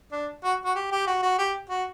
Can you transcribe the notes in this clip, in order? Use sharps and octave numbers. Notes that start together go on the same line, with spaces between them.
D4
F#4
F#4
G4
G4
F#4
F#4
G4
F#4